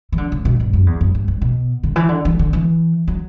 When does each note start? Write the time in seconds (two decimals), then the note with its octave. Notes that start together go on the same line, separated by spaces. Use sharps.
0.12 E3
0.18 D3
0.32 C#3
0.45 B2
0.60 G2
0.73 F#2
0.86 E2
1.01 F#2
1.15 G2
1.28 G2
1.42 B2
1.83 D3
1.96 E3
2.09 D3
2.25 E3
2.39 D3
2.53 E3
3.08 F#3